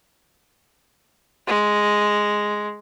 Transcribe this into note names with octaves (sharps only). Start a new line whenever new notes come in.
G#3